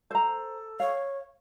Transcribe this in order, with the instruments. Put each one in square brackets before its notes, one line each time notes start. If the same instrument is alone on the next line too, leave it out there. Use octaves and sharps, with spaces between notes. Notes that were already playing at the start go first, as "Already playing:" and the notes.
[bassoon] A4 [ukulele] C5 A#5
[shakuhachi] C#5 [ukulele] F5